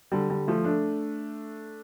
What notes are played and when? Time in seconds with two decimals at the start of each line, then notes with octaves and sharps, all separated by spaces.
0.12 D3 G3
0.30 D3 G3
0.47 F3 A3
0.64 A3 D4